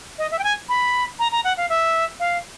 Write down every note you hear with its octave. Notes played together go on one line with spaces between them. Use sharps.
D#5
E5
G5
G#5
B5
A#5
A#5
F#5
F5
E5
F5